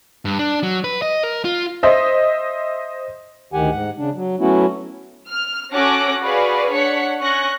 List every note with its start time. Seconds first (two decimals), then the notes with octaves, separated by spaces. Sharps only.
0.25 G2
0.39 D4
0.63 F#3
0.84 B4
1.02 D#5
1.24 A#4
1.45 F4
1.83 C5 D#5 E5
3.53 D2 D#3 G4 F#5 G#5
3.71 G#2 F#5
3.98 C#3 D4
4.15 F#3
4.40 F#3 A3 B3 C#4 E4 F#4
5.28 F6
5.73 C#4 F#4 A4 D6 F#6 A#6
6.20 F#4 G#4 B4 D5 F5
6.69 D4 C#5 F#5 B6 C#7
7.20 C#4 C#6 F#6 A#6